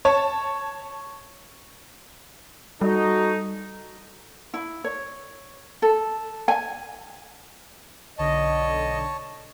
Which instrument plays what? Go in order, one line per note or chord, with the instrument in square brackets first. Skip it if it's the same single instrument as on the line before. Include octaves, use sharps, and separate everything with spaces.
[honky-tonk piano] C#5 A5
[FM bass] G3 [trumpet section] D#4 [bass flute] F#4 [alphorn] A4
[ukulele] E4
C#5
A4
G#5
[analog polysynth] B1 D3 [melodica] C#5 A5 [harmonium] D#5